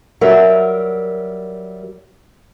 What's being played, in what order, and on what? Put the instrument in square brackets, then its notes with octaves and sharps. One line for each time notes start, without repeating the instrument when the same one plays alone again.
[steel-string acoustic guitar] F#3 G3 A#4 E5